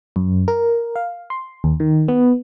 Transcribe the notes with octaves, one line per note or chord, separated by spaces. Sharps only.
F#2
A#4
F5
C6
D#2
D#3
B3